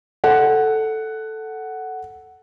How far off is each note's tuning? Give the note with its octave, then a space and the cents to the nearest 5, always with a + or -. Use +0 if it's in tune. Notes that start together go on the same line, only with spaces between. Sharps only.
A4 +0 F#5 +5